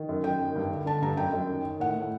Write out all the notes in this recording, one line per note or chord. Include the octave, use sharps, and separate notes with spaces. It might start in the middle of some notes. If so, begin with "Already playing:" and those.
Already playing: D#3
F#2
F#2 G5
D#3
G2
D3
D3 A5
G2 A#5
F#2 G5
F#2
D#3
D#3
A2 F#5
A2